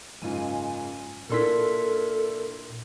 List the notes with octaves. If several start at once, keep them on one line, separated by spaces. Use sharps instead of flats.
F#1 G#2 F4 G#5
A#2 A#3 D4 E4 A4 A#4 C6 B6